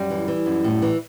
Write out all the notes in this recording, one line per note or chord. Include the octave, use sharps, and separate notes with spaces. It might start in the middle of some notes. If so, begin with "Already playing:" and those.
Already playing: F#2 G3
E3
E3
F#2
A2
E3